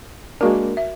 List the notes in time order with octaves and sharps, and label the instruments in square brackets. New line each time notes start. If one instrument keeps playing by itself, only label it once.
[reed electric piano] G#3 A#3 D4 [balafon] F#4 A#4
[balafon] E5